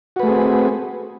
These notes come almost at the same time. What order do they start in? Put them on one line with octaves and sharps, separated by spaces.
F#4 B4 A3 G#4 C4